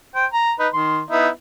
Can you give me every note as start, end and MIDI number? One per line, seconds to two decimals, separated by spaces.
0.15 0.26 72
0.15 0.26 79
0.33 0.52 82
0.60 0.68 63
0.60 0.68 71
0.74 1.01 51
0.74 1.01 84
1.11 1.28 59
1.11 1.28 63
1.11 1.28 64